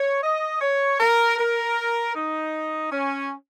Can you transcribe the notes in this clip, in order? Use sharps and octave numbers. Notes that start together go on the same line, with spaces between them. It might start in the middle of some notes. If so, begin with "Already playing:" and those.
Already playing: C#5
D#5
C#5
A#4
A#4
D#4
C#4